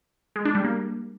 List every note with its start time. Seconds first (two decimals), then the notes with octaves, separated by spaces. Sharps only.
0.36 G#3
0.45 D4
0.55 G3
0.64 A#3